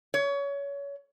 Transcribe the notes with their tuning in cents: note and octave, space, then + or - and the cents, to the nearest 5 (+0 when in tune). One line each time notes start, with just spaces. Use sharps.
C#5 +25